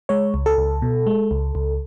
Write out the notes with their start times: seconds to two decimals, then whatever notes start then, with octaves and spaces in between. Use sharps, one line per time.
0.09 G#3 C#5
0.34 C#2
0.46 A4
0.58 C#2
0.82 B2
1.07 G#3
1.31 C#2
1.55 C#2